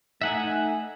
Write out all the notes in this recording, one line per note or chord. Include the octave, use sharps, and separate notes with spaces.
A3 D#4 E5 F#5 G#5